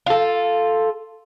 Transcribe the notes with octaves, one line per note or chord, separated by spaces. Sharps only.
F4 A4